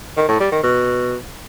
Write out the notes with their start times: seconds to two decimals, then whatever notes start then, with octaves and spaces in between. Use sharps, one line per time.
0.17 D#3
0.28 A2
0.40 G3
0.52 D#3
0.63 B2